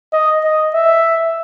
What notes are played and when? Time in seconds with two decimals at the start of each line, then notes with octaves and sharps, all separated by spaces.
0.13 D#5
0.44 D#5
0.74 E5